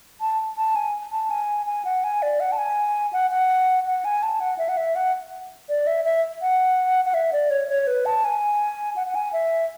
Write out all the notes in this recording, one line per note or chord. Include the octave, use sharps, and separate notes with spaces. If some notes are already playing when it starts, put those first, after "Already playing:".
A5
A5
G#5
A5
G#5
G#5
F#5
G#5
D5
F#5
A5
G#5
F#5
F#5
F#5
G#5
A5
F#5
E5
F#5
E5
F#5
D5
E5
E5
F#5
F#5
E5
D5
C#5
C#5
B4
A5
G#5
F#5
F#5
G#5
E5